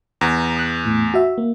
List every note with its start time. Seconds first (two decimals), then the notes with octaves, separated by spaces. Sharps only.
0.21 E2 A#5
0.56 D#6 F#6
0.85 A2
1.14 F#4 E5
1.38 A#3